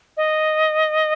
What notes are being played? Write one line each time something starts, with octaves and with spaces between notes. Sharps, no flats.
D#5